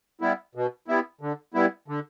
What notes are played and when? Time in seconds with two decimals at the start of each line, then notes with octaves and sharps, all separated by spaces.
0.21 G3 B3 E4
0.55 B2
0.88 G3 B3 E4
1.21 D3
1.54 G3 B3 E4
1.88 D3